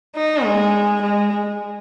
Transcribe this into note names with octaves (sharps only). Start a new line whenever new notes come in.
D#4
G#3
G#3